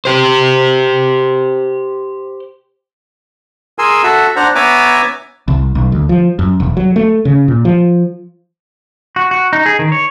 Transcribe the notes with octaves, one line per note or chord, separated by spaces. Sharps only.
G4 C5
G#4 A#4 G#5 C6 E6
F#4 A4 E5
D4 C5 F#5 A#5
B3 C#5 E5 G#5 A#5 D6
C2
B1
D2
F3
F#2
E1
F#3
A3
C#3
A#2
F3
F#4
F#4
D#4
G#4
D#3
C#5